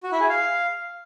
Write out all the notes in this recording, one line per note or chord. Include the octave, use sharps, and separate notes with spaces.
F#4
E4
G#4
F5